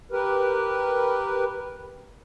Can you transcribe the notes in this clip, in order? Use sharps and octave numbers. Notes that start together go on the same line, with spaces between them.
G4 A#4 B4